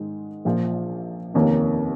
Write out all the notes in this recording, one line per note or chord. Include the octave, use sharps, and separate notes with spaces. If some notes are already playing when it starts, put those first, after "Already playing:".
Already playing: G#2 D#3 G#3
A#1 A#2 F3
F1 D#2 D#3 A#3 C#4